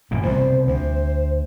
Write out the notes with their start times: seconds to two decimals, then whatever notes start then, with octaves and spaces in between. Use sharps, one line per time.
0.11 A1 F#2 A#2
0.24 C2 B2 C5
0.67 D2 C5